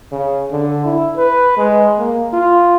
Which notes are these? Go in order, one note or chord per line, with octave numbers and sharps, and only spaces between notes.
C#3
D3
E4
B4
G#3
A#3
F4